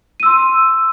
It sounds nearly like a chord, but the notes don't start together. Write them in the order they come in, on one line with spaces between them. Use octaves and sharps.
D#7 E6 C6